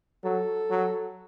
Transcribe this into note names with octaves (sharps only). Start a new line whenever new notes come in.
F#3 A4
F#3